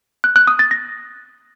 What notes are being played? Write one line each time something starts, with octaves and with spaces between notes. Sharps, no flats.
F#6
F#6
D#6
A6
A#6